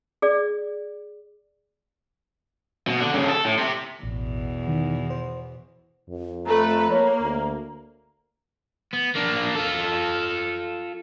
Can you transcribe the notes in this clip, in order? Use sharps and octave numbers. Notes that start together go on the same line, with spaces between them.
G#4 D5
B2
D3
G2 C#3
A4
A2
C3
A1 E2 B2
D#3
C5
F2
A3 A4 B4 A#5
A#3 C#5
D2
B3
A#3 D4
F4 A4